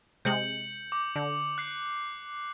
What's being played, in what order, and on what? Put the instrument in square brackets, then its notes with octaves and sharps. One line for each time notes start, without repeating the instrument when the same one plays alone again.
[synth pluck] C3 G#3 [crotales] G6 C#7 F#7
[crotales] D6
[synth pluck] D3
[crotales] F#6 C7